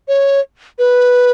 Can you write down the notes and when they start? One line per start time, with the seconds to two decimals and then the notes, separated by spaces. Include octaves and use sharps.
0.08 C#5
0.79 B4